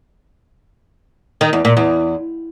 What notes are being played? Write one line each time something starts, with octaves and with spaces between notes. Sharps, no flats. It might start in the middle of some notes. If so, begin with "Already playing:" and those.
D#3
E2
A#2
E2